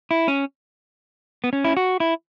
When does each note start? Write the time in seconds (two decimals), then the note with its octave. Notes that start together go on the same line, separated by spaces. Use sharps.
0.11 E4
0.28 C#4
1.44 B3
1.53 C#4
1.65 E4
1.77 F#4
2.00 E4